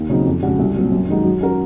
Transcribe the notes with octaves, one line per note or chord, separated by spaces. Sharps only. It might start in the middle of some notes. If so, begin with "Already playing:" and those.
Already playing: D#2
C#3 F#3 C4 D#4
F2
C#3 G#3 C#4 F#4
C2
A#2 F#3 C4
F#2
D#3 G#3 D#4 F#4
F#3
C#4 F#4 A#4